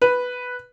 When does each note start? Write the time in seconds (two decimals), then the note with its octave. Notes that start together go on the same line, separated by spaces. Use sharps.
0.02 B4